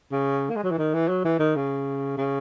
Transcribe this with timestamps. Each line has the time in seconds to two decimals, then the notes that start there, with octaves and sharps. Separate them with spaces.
0.11 C#3
0.49 A#3
0.56 G#3
0.63 F#3
0.71 E3
0.78 D#3
0.94 E3
1.08 F#3
1.25 E3
1.39 D#3
1.55 C#3
2.17 C#3